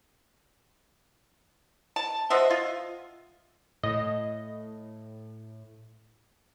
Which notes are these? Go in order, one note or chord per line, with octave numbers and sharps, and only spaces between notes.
A5
F#4 C5 D#5 E5
F4
A2 D#5